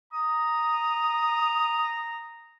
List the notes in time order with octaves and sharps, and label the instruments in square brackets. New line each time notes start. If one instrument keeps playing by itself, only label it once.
[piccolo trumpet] A#5 [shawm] D#6